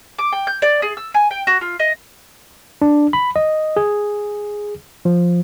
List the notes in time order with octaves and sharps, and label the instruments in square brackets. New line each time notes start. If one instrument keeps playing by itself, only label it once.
[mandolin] D6
G5
G6
D5
G#4
E6
G#5
G5
F#4
F4
D#5
[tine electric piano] D4
B5
D#5
G#4
F3